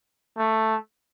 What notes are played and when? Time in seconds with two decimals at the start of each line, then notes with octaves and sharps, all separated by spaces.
0.38 A3